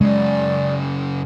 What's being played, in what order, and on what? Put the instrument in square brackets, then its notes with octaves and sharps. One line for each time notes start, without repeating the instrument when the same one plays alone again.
[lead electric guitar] F#2 C#3 [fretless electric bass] G#3 [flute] D5